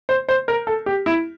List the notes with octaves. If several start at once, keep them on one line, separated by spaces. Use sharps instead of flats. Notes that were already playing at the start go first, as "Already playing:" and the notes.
C5
C5
A#4
A4
G4
E4